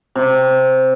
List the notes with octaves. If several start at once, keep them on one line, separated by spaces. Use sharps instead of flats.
C3